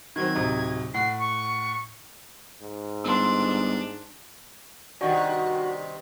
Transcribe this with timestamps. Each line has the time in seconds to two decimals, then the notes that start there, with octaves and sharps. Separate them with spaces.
0.16 D#3 F#3 C4 G#6
0.35 D1 C3 D#4
0.94 A2 F#5 C7
1.19 C#6
2.62 G#2
3.04 G1 D4 C6 E6
5.01 G2 C3 D#3 F#4 D5 D#5